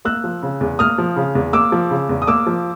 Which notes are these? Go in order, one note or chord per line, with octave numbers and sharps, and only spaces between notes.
A#3 E6 F#6
F3
C#3
E2
A#3 D#6 F6
F3
C#3
E2
A#3 D6 E6
F3
C#3
E2
D#6
A#3 D6 E6
F3